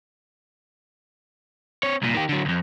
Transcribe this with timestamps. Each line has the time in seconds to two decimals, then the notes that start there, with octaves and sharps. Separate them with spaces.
1.83 C4 C#5
2.02 C2 A#2
2.15 D#3 G4
2.29 D3 F#3
2.45 C2 F2